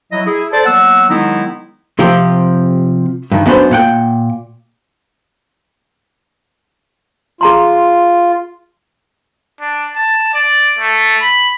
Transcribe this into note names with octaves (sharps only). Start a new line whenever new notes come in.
F#3 E4 D#5
E4 G#4
A4 C5 D5
F#3 A#3 B3 F#5 E6
D#3 F#3 G#3 B3 D#4 E4
C3 F3 C4 G4
G2 D#3
F#2 B3 D4 B4 C5
A#2 F#5 G5
F4 G#4 A#5 C6
D4
A5
D5
A3
B5